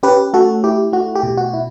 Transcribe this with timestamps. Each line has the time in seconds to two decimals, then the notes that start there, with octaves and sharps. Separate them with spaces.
0.03 C#4 G4 B4
0.33 A3 F#4 A4
0.64 E4 G4
0.93 A3 F#4
1.16 G4
1.23 B2
1.37 F#4
1.54 E4